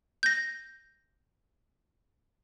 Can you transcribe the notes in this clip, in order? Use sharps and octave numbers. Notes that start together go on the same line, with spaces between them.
G6 A#6